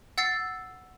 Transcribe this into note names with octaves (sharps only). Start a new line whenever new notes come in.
F#5 E6 A6 C7